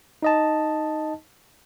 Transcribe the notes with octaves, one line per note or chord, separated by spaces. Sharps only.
D#4 D#5 A5